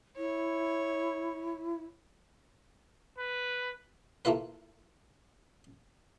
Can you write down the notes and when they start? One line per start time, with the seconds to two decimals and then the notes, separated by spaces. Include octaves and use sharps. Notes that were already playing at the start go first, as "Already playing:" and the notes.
0.17 E4 C#5
3.18 B4
4.25 A3 A#3 E4 F4 B4